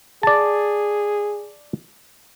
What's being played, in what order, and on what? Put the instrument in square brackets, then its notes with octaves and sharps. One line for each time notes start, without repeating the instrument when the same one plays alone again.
[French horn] G#4 [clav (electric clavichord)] D5 A5